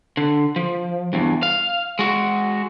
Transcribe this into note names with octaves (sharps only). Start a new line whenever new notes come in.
D3
F3
E2 G2
F5
G#3 F#4